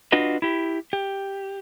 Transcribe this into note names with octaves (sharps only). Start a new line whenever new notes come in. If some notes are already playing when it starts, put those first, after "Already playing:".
D4 F4 F#4 B4 D#5
E4 G4
G4